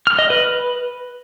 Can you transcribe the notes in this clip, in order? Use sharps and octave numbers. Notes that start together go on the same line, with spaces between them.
F6
D#5
B4